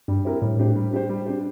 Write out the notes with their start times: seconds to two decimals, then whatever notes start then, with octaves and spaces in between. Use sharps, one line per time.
0.08 G2 G3
0.25 C4 E4 G4 A#4
0.42 A2 G3
0.59 D4 G4 C5
0.76 G3
0.92 D4 G4 C5
1.09 G3
1.26 D4 G4 C5